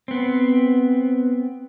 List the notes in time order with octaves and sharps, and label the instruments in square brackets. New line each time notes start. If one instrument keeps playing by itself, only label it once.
[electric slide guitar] B3 C4